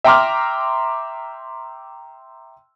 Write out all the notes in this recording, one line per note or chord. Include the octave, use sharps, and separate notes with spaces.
E5 G5 A#5 C6 D6 F6